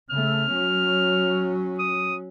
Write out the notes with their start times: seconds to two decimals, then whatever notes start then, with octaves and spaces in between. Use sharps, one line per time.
0.10 C#3 A3 F6
0.52 F#3 C#4
1.79 D#6